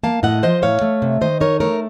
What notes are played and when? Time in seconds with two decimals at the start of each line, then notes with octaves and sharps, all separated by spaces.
0.03 A#3 F5 A5
0.23 A2 D#5 F#5
0.43 F3 C5 D#5
0.62 A2 C#5 F5
0.82 A3
1.02 C3
1.21 D#3 C5 D#5
1.40 D#4 A#4 C#5
1.60 A3 A#4 C#5